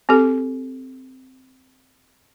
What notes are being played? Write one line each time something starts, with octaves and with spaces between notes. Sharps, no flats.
C4 G4 A4